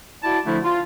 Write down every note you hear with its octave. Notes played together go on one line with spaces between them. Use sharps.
E4 F#4 D5 A5
D3 F3 A3 D4 E4
F4